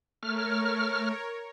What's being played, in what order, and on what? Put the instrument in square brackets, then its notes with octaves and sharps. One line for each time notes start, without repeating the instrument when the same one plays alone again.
[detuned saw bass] A3 [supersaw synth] A#4 C#5 [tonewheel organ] F6